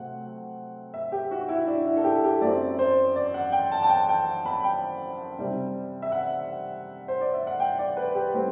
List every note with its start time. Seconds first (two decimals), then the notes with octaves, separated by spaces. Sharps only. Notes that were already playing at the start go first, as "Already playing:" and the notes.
Already playing: C3 F#3 A3 C4 F#5
0.94 E5
1.12 G4
1.31 F#4
1.49 E4
1.67 D4
1.86 E4
1.97 A4
2.04 G4
2.24 G4
2.41 F#2 F#3 C4 D5
2.79 C5
3.16 D5
3.34 F#5
3.52 G5
3.72 A5
3.83 A5
3.89 G5
4.09 G5
4.46 B5
4.64 G5
5.38 C3 G3 C4
6.02 E5
6.12 F#5
7.08 C5
7.21 D5
7.34 E5
7.47 F#5
7.60 G5
7.79 D5
7.97 B4
8.15 G4
8.33 A2 G3 C4